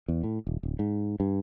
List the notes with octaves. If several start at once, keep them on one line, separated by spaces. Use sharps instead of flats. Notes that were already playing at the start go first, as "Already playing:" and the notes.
E2
A2
D#1
D1
G#2
G2